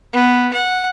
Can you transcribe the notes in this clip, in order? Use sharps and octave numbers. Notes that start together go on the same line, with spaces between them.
B3
F#5